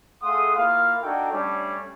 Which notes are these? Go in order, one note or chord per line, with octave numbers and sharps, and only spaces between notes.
A3 G#4 F5 F#5 C6 D#6
A#3 E4 F4 F5
D4 D#4 F#4 A4 G5 G#5
G3 A3 C#4 D4 C#5 D5